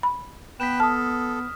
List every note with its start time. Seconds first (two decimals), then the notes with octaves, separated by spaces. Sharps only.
0.03 B5
0.60 B3 B4 G5 F#6 B6 E7
0.80 A4 A5 D#6 F6